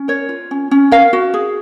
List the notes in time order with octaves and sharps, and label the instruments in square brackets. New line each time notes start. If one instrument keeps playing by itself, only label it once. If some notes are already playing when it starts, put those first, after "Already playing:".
Already playing: [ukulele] C#4
A#4 C#5
F4
C#4
C#4
A#4 F5
F#4
G#4